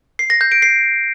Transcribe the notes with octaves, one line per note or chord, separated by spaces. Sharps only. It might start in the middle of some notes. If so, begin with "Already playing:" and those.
C7
A#6
G6
D7
C7